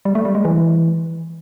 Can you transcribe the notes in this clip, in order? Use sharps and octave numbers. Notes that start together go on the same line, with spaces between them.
G3
A3
G3
G#3
E3